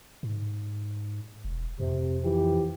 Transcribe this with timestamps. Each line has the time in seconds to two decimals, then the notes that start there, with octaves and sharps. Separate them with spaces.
0.23 G#2
1.45 E1
1.80 F2 C3
2.24 E3 F3 G4